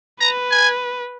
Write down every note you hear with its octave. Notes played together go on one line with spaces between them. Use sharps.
B4 A#5
G#5